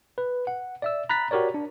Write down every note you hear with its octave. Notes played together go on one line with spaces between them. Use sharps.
B4
F#5
D5 E5 E6
A#5 B5 F#6 A6 B6
F#4 G4 A#4 C#5 D5
D4